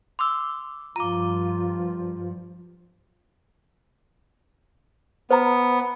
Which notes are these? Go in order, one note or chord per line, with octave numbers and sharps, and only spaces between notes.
C6 D6 E6
G2 F3 F4 A#5 D6
B3 C5 A#5